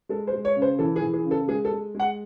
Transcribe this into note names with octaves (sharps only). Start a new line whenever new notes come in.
G#3 A4
C5
G#3
C#5
C#3
C5
E3 A4
G#4
E3
G#4
C#3
A4
G#3 G#4
A4
G#3
G#3 F#5